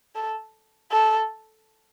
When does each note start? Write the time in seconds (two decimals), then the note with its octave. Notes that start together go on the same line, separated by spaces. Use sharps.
0.15 A4
0.92 A4